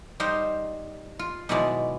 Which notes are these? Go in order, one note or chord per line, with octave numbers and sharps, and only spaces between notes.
G3 D#4 C5 F5 G5
F4
B2 D#3 F#3 G#3 E4 D5